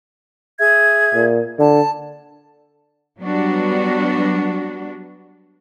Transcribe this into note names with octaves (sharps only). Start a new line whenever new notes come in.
G#4 E5 G#6
A#2
D3 A5
F#3 G3 B3 D4 F#4